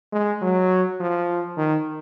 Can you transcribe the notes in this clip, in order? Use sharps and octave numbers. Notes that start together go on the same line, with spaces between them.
G#3
F#3
F3
D#3